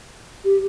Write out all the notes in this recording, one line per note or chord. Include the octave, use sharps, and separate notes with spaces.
G4